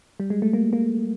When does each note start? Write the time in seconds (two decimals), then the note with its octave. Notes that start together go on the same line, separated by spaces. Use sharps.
0.20 G3
0.30 G#3
0.42 A3
0.53 A#3
0.73 A#3